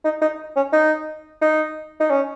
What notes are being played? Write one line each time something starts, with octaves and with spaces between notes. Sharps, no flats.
D#4
D#4
C#4
D#4
D#4
D#4
C#4